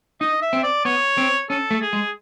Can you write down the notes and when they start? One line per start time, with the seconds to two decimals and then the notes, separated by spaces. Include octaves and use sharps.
0.21 D#4 D#5
0.42 E5
0.53 C4
0.63 D5
0.85 B3 C#5
1.18 C4
1.50 C#4 A4
1.71 A3
1.82 G#4
1.93 G#3